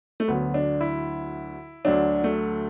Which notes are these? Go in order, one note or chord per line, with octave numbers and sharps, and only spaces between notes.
A3
D2 D3 F#3 B3
D4
E4
D2 D3 F#3 D4
A3